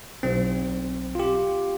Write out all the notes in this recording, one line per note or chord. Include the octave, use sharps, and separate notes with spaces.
B1 C4
F4 G4